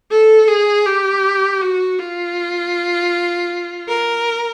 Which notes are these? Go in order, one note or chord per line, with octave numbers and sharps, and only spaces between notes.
A4
G#4
G4
F#4
F4
A#4